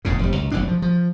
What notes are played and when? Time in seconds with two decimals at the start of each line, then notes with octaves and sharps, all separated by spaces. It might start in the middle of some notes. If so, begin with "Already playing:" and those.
0.05 E1 E2 A2 C#3
0.19 F1 G3
0.36 C#2
0.51 F1 B1 A2 D4
0.68 F3
0.82 F3